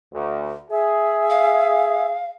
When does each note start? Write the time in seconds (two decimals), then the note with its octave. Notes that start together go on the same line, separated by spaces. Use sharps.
0.14 D2
0.71 G#4 E5
1.30 F5